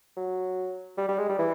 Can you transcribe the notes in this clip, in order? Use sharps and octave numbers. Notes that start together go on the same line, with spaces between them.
F#3
G3
G3
G#3
G3
E3